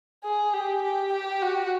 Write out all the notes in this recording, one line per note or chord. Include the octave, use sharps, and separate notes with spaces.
G#4
G4
G4
G4
F#4